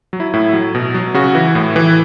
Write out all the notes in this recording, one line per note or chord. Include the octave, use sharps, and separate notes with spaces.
F#3
E4
A2 E4
F#3
B2
F#3
C#3 F#4
E3
A2
E3